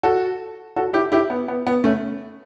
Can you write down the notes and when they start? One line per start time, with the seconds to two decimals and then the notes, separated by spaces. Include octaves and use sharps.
0.03 F#4 A4
0.76 F#4 A4
0.93 E4 G4
1.12 E4 G4
1.30 B3
1.48 B3
1.67 B3
1.84 A3 C#4